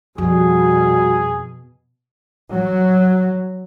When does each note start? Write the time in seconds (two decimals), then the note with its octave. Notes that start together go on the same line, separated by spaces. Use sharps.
0.18 F2 B2 G3 F#4 G#4
2.52 F#3